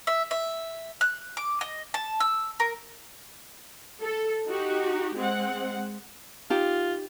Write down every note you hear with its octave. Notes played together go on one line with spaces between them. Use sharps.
E5
E5
F#6
D6
D#5
A5
E6
A#4
A4
D#4 F#4 G4
G#3 C4 F#5
D#4 F4 G4